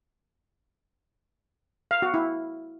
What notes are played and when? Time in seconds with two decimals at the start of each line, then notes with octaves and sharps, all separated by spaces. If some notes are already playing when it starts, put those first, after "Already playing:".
1.91 F5
2.02 F#4
2.14 E4